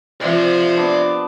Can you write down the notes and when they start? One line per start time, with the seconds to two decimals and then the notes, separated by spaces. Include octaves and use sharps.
0.21 C3 F3 D5 E5
0.77 B3 D4